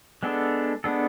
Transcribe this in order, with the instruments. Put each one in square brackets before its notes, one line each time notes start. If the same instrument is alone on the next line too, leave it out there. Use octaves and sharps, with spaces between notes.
[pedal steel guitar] G#3 B3 D4 A4
G#3 B3 D4 A4